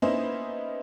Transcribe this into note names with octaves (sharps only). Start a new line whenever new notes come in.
A#3 B3 C#4 D#4 E4 C5